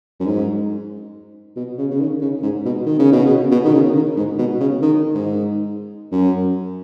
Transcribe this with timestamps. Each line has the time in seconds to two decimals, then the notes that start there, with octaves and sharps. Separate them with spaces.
0.20 F#2
0.26 G#2
1.56 B2
1.78 C#3
1.91 C#3
2.00 D#3
2.21 C#3
2.43 G#2
2.65 B2
2.86 D#3
2.99 C#3
3.12 B2
3.25 C#3
3.52 B2
3.64 D#3
3.74 C#3
3.95 D#3
4.17 G#2
4.38 B2
4.60 C#3
4.82 D#3
5.14 G#2
6.12 F#2